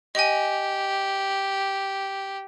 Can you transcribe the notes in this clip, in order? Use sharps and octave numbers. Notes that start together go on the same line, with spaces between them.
G4 D#5 G#5